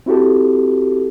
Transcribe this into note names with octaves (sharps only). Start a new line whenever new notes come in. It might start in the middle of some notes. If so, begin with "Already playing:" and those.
C4 E4 F#4 G4 A4